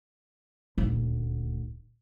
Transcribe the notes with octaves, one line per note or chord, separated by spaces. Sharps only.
D#1 D2